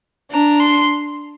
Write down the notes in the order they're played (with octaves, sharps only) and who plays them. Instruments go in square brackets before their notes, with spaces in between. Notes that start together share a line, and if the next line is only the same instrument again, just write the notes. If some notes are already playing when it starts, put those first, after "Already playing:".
[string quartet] D4 [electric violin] A#5
[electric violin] C6